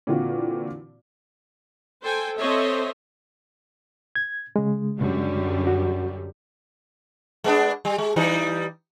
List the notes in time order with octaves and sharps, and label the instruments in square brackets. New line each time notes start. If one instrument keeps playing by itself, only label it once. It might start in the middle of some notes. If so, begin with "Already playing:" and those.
[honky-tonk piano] A#2 D3 E3 C4 F4 F#4
[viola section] A4 C5 G5 G#5
C4 A4 C5 C#5 D#5 E5
[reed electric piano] G#6
C#3 G#3
[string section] F#2 D3 G3
[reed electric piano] F#4
[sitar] G#3 B3 D4
G3
G#3
E3 G3 D#4